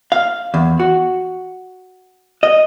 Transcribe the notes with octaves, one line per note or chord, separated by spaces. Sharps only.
F5
E2
F#4
D#5